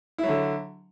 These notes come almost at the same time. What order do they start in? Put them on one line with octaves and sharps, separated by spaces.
E4 F#3 D3